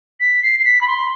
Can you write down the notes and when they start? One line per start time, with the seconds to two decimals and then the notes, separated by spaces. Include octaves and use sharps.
0.20 B6
0.43 C7
0.60 C7
0.65 B6
0.81 B5
0.87 C6